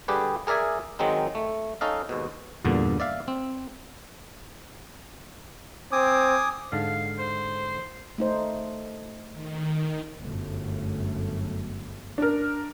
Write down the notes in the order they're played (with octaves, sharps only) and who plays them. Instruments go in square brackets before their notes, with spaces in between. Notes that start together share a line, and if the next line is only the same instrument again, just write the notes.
[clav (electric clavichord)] D3 G3 G4 G#4 B4
G#4 A#4 D5 E5 G#5
D#3 F#3 G#3 C4 D#4
A3
C#4 D#4 A4 D#5 F5
D#2 G#2 B2
E2 G2 A#2 D3
D5 E5 F5
C4
[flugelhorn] C4 [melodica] G#5 D6 D#6
[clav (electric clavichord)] G#2 D3 A5 [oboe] F5
[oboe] C5
[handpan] A3 D#4 C5
[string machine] D#3
[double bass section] G1 F#2 A3
[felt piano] D4 A#4